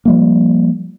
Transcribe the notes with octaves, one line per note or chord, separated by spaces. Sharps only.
F3 G3 A#3